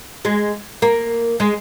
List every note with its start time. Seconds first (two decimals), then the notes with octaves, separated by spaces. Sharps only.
0.25 G#3
0.82 A#3
1.40 G#3